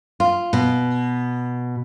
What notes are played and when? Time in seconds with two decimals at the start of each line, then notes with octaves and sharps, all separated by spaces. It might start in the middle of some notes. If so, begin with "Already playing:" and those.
0.20 F4
0.53 B2